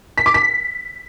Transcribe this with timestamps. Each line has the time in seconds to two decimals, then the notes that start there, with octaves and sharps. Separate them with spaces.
0.18 B6
0.26 D6
0.34 B6